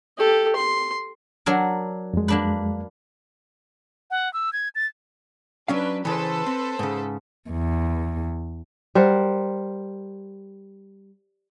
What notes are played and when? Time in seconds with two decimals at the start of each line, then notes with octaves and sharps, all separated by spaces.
0.18 G4 A4
0.56 C6
1.46 F#3 D4 A#4
2.14 F2 G#3
2.28 A#3 D4 B4
4.11 F#5
4.33 E6
4.53 G#6
4.75 A6
5.68 F#3 C#4 D4 B4 F5
6.05 C#3 E3 A4 B4 C5
6.47 C4
6.79 G#2 C#3
7.49 E2
8.95 G3 A#4 C5 F#5